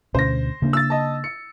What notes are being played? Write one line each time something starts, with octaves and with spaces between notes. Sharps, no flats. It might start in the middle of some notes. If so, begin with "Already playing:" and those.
D2 B2 C#4 C5 A#6
C#3 A#3 D4
E6 A6
D#5 A5
C#7